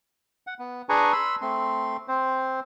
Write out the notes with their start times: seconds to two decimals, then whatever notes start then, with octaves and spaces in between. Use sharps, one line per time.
0.47 F#5
0.59 B3
0.89 D4 G#4 B4 G#5 A#5 C#6
1.13 B5 C6 E6
1.42 A3 C4 C6
2.08 C4 C5